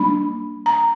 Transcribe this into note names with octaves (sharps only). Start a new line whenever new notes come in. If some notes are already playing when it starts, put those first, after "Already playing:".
Already playing: G3 A#3 D4 B5
A#5